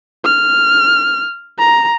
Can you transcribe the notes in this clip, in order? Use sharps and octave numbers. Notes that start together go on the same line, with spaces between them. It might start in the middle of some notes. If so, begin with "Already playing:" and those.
F6
A#5